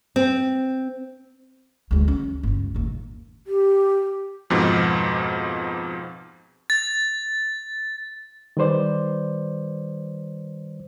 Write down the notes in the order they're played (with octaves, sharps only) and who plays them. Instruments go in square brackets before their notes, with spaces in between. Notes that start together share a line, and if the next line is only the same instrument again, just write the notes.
[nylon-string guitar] C4
[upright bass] D2 G#3
C#4
G1 C#2
D#2 A#2
[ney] G4
[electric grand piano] F2 G#2 B2 F3
[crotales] A6
[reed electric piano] D#3 G3 B4 C5 D5